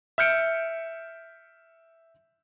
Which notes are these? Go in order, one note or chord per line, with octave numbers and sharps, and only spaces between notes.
E5 F6 G6 C#7 D7